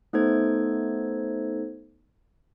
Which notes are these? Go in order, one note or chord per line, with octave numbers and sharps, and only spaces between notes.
A3 B3 D#4 A4 C5 G#6